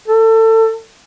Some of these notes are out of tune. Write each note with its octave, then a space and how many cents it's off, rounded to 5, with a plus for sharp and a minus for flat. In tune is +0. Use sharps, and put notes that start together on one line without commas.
A4 +25